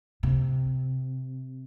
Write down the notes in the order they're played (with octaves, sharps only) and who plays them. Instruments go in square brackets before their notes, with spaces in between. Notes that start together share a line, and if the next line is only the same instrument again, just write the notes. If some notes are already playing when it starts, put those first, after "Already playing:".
[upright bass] C3